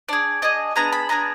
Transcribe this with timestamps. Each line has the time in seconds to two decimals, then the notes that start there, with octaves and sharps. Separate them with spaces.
0.08 D4 G#4 D5
0.42 D4 G#4 D#5
0.76 B3 D4 G#4 A#5
0.92 B5
1.09 B3 D4 G#4 A#5